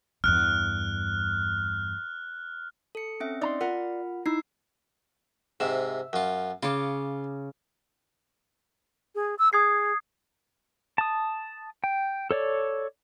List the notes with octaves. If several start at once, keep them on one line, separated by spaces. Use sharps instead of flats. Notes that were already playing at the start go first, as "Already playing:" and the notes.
E2 G2 F6 F#6
A4 C#7
C4 C#4 E5
D#4 D5 A#5 C6
F4 A#4 F#5
D#4 E4 E6 G#6 C7
G#2 C3 E5
F#2 F4
C#3 F4 D6
G#4
E6
G#4 D#6 G#6 C7
A5 D#6
G5
A4 C#5 D5